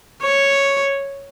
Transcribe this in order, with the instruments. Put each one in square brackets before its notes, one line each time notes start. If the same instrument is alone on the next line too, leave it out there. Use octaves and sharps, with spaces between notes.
[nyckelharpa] C#5